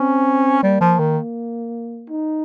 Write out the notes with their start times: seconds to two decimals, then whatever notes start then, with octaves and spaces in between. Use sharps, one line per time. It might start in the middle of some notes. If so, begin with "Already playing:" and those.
Already playing: C4 C#4
0.62 G3 A#3
0.81 F3
0.99 D#3
2.10 D#4